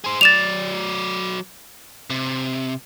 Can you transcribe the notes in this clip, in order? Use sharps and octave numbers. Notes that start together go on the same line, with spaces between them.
G#4 C5
F#3 D5 A6 E7 F7
C3